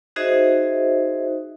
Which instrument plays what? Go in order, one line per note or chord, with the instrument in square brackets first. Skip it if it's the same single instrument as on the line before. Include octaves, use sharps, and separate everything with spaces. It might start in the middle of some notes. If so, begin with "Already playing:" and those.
[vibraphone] D#4 F#4 G#4 C5 D#5 E5